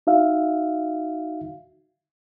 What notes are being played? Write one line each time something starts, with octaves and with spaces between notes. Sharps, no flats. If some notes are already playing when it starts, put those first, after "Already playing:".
D#4 F#4 E5 F5